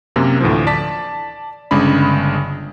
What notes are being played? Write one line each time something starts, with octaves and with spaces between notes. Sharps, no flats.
F#2 C3 A#3
D2 A2 E3 F3
D5 A5 B6
G1 C#3 G#3 D4 B5